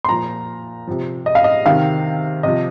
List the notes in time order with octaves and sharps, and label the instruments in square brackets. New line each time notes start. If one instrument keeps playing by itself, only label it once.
[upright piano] C6
A#2 F3 A#5
C3 F3
D#5
F5
D#5
C3 D#3 F5
C3 F3 D#5